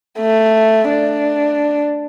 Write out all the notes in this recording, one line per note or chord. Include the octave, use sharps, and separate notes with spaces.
A3
D4